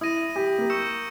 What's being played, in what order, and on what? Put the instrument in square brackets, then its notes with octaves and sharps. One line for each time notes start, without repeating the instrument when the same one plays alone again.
[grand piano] E4 [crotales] D#6 A#6 D#7
[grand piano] G4
A#3
[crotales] C#6 E6 G6 C#7 E7